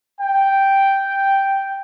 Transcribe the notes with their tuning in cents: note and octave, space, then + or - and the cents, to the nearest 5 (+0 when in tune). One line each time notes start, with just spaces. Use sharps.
G5 +0